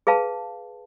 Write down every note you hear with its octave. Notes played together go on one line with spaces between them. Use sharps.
G#4 B4 F5 A5